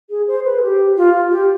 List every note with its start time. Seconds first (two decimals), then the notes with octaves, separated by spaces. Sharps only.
0.10 G#4
0.28 C5
0.45 B4
0.59 G#4
0.62 G4
0.97 F4
1.31 G4